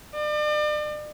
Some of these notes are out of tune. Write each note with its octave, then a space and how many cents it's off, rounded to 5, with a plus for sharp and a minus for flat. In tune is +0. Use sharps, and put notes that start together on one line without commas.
D5 +40